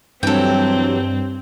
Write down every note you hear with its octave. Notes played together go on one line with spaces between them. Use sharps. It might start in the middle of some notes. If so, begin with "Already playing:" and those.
G2 E3 F#3 C4 A4 G5